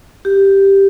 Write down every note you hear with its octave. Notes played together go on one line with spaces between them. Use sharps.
G4